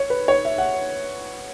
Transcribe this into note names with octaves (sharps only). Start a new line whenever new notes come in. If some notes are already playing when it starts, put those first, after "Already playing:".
Already playing: C#5
B4
C#5
E5
F#5